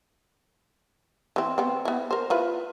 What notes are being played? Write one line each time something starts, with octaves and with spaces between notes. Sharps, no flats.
E3 C4
B3 C4
B3 E4
A#4 C5
E4 F4 B4